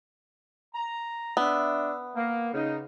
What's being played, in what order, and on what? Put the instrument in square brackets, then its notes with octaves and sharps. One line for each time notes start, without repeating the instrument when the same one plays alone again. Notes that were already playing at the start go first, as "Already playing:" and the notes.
[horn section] A#5
[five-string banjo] B3 [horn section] D4 E5
[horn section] A#3
C#3 D#4